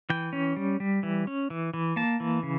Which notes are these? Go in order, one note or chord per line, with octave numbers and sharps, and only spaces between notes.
E3 G5
C#4
G3
G3
E3
C#4
E3
E3
A#3 A5
E3
C#3